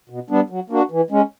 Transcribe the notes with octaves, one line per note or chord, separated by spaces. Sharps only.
B2
G3 B3 D4
F#3
A#3 D4 F#4
E3
G#3 C#4